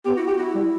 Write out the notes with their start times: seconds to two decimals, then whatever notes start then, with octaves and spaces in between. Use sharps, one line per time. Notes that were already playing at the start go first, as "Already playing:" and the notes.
0.05 B3 G4
0.16 E4 F#4
0.27 F#4 G4
0.38 E4 F#4
0.55 G3